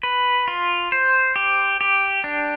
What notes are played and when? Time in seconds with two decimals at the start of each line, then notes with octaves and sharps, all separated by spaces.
0.03 B4
0.48 F4
0.92 C5
1.36 G4
1.81 G4
2.24 D4